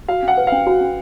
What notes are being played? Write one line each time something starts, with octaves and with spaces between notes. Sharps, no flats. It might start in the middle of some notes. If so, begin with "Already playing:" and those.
F#4 F5
C#4
F#5
B4
F5
C#4
F#4
C#4